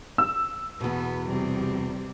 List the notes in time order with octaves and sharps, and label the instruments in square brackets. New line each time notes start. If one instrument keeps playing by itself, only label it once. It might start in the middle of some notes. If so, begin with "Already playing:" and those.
[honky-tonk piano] E6
[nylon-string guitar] E2 B2 [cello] B3
[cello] C3 G3